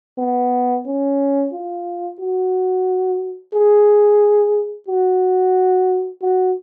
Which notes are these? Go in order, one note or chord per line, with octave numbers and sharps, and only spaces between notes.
B3
C#4
F4
F#4
G#4
F#4
F#4